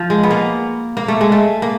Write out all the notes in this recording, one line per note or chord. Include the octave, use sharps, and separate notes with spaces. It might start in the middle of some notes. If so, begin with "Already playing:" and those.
Already playing: F3
G#3
B3
A#3
A#3
A3
G#3
A3
A#3